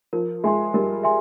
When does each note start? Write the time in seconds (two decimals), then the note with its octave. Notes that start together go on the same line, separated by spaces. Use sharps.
0.13 F3 A#4
0.44 G#3 E5 G#5 C6
0.74 G3 A#4
1.04 E5 G#5 C6